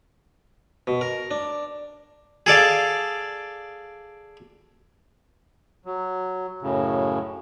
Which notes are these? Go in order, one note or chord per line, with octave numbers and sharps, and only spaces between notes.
B2
A#4
D4
G#4 A4 D5 F5
F#3
F#2 A2 C#3